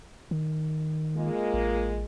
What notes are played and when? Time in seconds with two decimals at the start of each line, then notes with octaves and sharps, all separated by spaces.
0.31 D#3
1.16 G#3 A#3 F4
1.54 A1